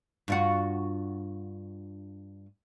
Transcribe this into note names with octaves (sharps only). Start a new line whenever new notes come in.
G2 F4 F#4